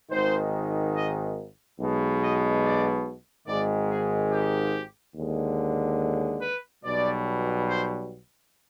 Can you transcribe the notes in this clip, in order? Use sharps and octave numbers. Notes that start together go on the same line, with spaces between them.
G#1 G#2 D#3 C5
D#5
B1 B2 G#3
D#5
D5
G#1 G#2 D#3 G#3 D5
G#4
G4
D#2 D3 G#3
B4
B1 B2 G3 D5
C5